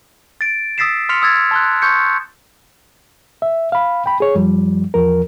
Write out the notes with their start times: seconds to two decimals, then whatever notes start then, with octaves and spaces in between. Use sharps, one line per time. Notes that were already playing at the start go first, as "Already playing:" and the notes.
0.41 A6 D7
0.78 D#6 E6 A6 B6 C7 E7
1.09 C6 F6 B6 C#7 F7
1.22 D#6 E6 G#6 A6
1.51 A5 C6 F#6
1.82 C6 C#6 G6 C#7
3.42 E5
3.72 F5 B5
4.06 G5 B5
4.20 G#4 C#5
4.35 F#2 F3 G3
4.94 E2 F3 A#4